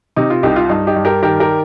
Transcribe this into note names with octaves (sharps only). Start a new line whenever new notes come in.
C3 D#4
F4
C2 D#4 G4
F4
G2 D#4
D#4 G4
G2
G4 A#4
D#3 G4 A#4
G4 A#4